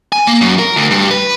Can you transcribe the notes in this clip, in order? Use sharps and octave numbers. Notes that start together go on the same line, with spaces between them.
G#5
A#3
F#2
A#4
D2
G2
B4